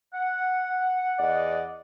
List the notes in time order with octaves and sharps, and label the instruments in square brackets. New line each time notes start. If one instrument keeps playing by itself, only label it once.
[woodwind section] F#5
[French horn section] E2 D5 D#5